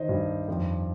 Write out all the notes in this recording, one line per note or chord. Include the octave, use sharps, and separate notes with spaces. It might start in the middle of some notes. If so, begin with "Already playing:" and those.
Already playing: D#3 C5 D#5
G2
F2